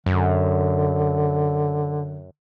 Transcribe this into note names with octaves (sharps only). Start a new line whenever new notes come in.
F#2 D3